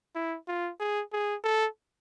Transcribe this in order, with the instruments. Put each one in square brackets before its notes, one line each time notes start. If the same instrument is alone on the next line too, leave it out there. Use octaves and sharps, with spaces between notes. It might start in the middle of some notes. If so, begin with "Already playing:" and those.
[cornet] E4
F4
G#4
G#4
A4